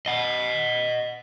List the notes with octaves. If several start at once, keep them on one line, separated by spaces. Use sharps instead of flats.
D#5 F#5